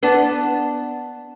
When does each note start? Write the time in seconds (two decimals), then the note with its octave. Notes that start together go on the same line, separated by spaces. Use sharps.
0.03 B3 D4